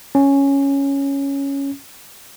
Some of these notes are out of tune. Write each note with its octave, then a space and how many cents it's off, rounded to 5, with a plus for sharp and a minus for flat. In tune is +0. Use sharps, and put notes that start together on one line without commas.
C#4 +0